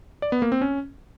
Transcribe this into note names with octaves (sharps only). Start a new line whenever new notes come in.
D5
B3
A#3
C4
C#4